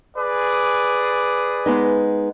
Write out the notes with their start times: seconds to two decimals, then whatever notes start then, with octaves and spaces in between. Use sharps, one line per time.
0.17 G#4 B4 D5
1.66 G#3 B3 D#4